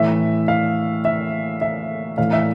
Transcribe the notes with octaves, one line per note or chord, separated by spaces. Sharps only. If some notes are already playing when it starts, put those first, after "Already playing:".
Already playing: A2 E3 E5
F5
E5
E5
A2 E3 F5
E5